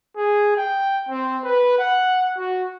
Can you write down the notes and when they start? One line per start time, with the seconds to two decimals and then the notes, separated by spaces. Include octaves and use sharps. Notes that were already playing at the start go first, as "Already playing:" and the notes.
0.17 G#4
0.57 G5
1.09 C4
1.44 B4
1.79 F#5
2.38 F#4